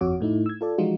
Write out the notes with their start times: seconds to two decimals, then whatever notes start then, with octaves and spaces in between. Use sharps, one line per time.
0.01 G1 F2 F#4 C#5 D6
0.20 A2 A3 D#4 E4
0.46 E6 G#6
0.61 F4 A4 D5
0.78 E3 F3 G#3 D#4 F4 F#4